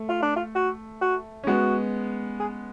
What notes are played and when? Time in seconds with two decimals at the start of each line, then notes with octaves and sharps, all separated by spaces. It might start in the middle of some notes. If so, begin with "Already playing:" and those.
Already playing: A3
0.09 F4
0.23 D4
0.36 F4
0.55 F#4
1.02 F#4
1.44 C#4
1.47 G#3 B3 F#4
2.40 G#4